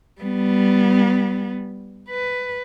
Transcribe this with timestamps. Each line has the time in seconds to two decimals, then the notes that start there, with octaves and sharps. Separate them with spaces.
0.21 G3 B3
2.10 B4